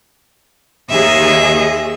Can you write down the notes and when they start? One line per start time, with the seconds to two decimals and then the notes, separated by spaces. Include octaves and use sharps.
0.90 D#2 G#4 D#5 E5